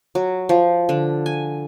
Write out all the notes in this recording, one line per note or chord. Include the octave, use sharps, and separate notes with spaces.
F#3
F3
D3
G#5